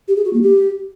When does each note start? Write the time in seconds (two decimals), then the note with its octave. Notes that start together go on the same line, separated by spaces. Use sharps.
0.08 G4
0.17 G#4
0.25 F#4
0.33 A#3
0.42 G4